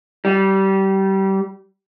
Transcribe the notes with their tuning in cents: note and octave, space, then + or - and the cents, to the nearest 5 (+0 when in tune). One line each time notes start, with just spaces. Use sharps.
G3 -25